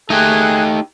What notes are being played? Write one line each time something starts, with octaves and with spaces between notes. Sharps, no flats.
A3 D#4 G4 G#4 F#6 G#6